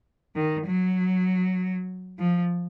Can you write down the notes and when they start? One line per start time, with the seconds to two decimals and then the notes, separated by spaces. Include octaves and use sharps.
0.36 D#3
0.67 F#3
2.19 F3